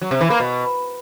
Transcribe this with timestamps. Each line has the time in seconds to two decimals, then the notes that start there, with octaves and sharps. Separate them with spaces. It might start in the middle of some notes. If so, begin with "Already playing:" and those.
0.02 F#3
0.11 C3
0.21 E3
0.30 A#3
0.40 B2